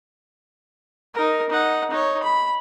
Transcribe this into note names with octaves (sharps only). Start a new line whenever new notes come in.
D#4 A#4
D#4 F#5
D#4 C#5
B5